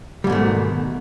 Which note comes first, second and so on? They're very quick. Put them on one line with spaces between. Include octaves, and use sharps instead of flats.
G3 G#2 B2 A3 D#3